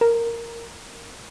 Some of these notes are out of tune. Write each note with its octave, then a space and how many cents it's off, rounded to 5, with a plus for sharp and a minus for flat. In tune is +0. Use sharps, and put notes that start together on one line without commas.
A#4 -5